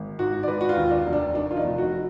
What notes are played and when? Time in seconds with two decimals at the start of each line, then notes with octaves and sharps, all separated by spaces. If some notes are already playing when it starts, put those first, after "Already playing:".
Already playing: G#1
0.19 G#2 F#4
0.43 D5
0.48 G#3 B4
0.61 F#4
0.69 F4
0.76 D#2
0.91 D4
1.06 F1
1.13 D4
1.35 D#3 D4
1.51 F4
1.57 D#4
1.64 F1
1.78 F#4